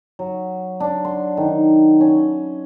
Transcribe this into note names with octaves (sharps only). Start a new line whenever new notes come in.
F#3
D4
C6
D#3
C#4